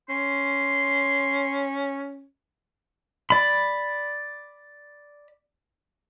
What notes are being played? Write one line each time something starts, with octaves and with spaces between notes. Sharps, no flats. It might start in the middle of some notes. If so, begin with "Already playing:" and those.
C#4 C6
D5 B5